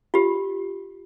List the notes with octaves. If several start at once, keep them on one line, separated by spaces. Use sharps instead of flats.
F4 G4